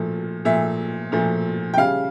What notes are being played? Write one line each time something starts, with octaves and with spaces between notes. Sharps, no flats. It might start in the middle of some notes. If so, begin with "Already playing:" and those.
Already playing: A#2 F3 A3
A#2 F3 A3 E5
A#2 F3 A3
G5
C#3 G3 F5